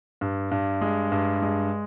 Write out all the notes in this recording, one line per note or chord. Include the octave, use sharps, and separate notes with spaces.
G2
G2
G#3
G2
G#3